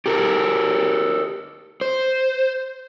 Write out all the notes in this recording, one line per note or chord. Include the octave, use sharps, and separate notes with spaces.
G4 A4 A#4
C5